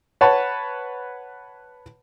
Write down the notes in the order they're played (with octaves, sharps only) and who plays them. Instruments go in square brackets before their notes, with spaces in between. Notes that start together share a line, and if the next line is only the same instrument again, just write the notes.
[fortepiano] B4 C#5 F#5 A5 B5